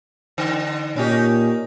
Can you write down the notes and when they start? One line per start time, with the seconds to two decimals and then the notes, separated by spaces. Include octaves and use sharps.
0.38 D3
0.96 A#2 C#4 D#4 G4